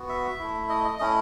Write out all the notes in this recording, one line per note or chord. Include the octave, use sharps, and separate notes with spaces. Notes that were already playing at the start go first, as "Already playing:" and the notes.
Already playing: B3 F#4
E5
A3 E4
D#5
D#5
A3 C#4 E4 D#5